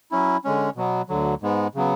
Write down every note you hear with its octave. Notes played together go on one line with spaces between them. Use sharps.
F#3 C#4 E4
D3 G#3 C#4
B2 F#3 B3
D2 D3 F#3
G#2 G#3 B3
C#3 F#3 B3